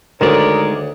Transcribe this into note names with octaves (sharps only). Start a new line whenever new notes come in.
D2 D#3 G#3 A#4 C#5 D5